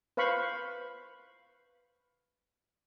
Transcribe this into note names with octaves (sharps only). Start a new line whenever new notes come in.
B4 C5 F5 B5 C#6